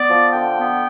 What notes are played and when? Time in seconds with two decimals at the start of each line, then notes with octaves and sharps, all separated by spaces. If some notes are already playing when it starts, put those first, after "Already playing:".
Already playing: B3 D5
0.09 F3
0.33 D3 G5
0.57 B3